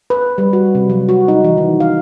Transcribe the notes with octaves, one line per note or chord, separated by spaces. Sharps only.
B4
G3
F#4
C3
F#3
F#4
D#4
E3
D#3
F5